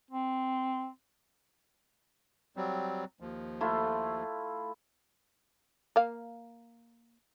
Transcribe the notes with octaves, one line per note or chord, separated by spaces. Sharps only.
C4
F#3 G3 C4
D#2 F3
A3 E4 F4
A#3 F5